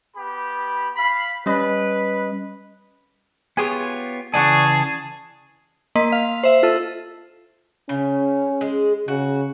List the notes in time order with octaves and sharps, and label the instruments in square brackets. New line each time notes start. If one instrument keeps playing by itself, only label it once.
[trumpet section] B3 G4 B5
F5 B5
[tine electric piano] G3 C#4 D#5 [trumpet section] B4
[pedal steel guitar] B3 F4 C#5 [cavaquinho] G4 G#4 G#5
[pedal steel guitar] C#3 E3 G#5 [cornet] G#4 [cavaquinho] D5 F#5 C#6 [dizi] A5
[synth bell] A#3 D#5 C6 B6
F5
C5 E5
F4 A4 E6
[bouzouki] C#3 [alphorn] C#4
[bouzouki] G#3 G#4
[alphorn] C#3 [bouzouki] F#4